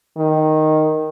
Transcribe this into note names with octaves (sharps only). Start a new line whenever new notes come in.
D#3